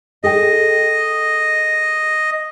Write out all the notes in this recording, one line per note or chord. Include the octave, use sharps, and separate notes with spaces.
G#4 A4 D#5 G5